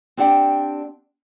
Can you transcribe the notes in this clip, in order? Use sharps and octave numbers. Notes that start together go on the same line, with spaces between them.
C4 D4 G4 D5 F#5 G5